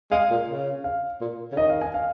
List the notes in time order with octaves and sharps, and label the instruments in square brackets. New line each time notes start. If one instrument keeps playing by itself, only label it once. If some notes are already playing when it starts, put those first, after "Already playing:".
[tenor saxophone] G#3 [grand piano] F5
[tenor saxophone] A#2
C#3
[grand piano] F5
[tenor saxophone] A#2
C#3
[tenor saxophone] D#3 [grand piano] D#5
[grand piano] F5
G#5
F5